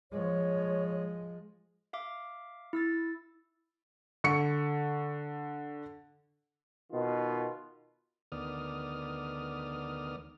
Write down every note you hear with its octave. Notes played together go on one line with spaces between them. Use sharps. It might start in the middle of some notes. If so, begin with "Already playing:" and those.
F3 G#3 C#5
E5 F5 D6
E4 E6 A6
D3 C#6 C#7
B2 D#3 F4
D2 D#3 B3 D5 D#6 F6